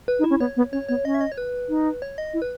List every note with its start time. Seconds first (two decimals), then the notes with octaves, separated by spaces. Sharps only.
0.08 B4
0.19 D#4
0.24 E4
0.30 C#4
0.40 B3 C#5
0.57 B3
0.72 C#4 C#5
0.89 B3 C#5
1.05 C#4 D#5
1.14 E5
1.21 D#5
1.32 C#5
1.38 B4
1.69 D#4
2.02 C#5
2.18 D#5
2.34 E4
2.42 B4